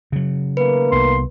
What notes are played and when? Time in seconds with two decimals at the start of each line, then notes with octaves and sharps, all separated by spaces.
0.12 C#3 F#3
0.57 D#3 A3 A#3 B4
0.92 C2 B3 C6